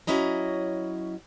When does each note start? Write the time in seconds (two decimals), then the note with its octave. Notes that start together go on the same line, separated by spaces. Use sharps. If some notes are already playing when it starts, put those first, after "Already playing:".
0.07 F#3 C#4 E4 D#5 A#5